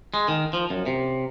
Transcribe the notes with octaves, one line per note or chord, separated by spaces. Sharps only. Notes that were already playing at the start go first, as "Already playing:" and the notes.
G#3
D#3
F3
F#2
C3